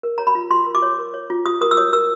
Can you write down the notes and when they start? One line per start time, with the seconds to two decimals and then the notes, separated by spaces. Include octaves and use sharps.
0.03 A#4
0.18 C#5 A#5
0.27 B5
0.35 F4
0.51 F4 C6
0.66 A#4
0.75 D6
0.82 C#5
0.98 A#4
1.14 C#5
1.30 F4
1.46 F4 D#6
1.61 A#4 D#6
1.71 E6
1.77 C#5 D#6
1.93 A#4 E6